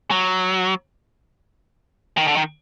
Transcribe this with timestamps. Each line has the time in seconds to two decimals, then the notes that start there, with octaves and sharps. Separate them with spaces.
0.11 F#3
2.17 D#3
2.28 D3
2.37 D#3